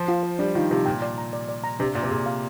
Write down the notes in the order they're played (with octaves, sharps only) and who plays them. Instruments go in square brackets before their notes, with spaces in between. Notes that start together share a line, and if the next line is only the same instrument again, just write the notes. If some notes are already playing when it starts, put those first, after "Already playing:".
Already playing: [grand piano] F3
[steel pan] F4
C5
[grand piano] G3 [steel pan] D4
[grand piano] D#3 [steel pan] F4
[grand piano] C3 [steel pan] F4
[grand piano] A#2 [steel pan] G5
[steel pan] D5
A#5
D5
D5
A#5
[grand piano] C3 [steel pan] D4
[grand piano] A#2 [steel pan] D5
[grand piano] C3
[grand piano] A#2 [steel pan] G#4
[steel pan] F5